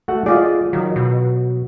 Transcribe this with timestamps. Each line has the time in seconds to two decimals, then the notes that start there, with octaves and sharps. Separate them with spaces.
0.08 A3 F#4 F#5
0.26 F4 G#4 D5 D#5
0.73 D#3 F#3
0.96 B2